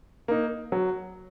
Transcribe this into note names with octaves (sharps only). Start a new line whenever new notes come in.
A#3 D#4
F#3